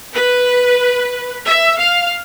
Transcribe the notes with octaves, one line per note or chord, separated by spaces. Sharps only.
B4
E5
F5